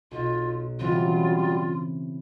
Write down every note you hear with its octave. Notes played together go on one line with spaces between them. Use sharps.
B1 F4
C#3 E3 F#3 G3 C4 F4